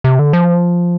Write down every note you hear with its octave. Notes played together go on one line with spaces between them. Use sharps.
C3
D3
F3